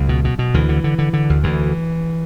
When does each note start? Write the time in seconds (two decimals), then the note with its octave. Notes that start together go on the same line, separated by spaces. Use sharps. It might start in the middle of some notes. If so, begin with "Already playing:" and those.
Already playing: C#2 F#3
0.09 B2
0.24 B2
0.39 B2
0.54 D2 E3
0.69 D3
0.84 D3
0.98 D3
1.13 D3
1.30 D2
1.43 D2 E3